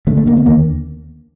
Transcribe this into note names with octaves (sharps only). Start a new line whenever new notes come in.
D3 A3
A3
D3 A#3
B3
D#2 A#3